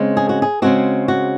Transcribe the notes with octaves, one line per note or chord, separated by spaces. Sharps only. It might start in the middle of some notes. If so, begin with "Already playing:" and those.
Already playing: C#3 G#3 C4
G#4
F#4
G#4
C#3 G#3 C4 F#4
F#4